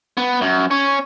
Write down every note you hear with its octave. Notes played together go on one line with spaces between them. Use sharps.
B3
F#2
C#4